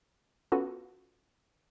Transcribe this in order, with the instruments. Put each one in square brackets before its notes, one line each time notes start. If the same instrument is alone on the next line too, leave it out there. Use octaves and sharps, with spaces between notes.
[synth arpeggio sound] B3 C#4 F4 F#4 A4 B4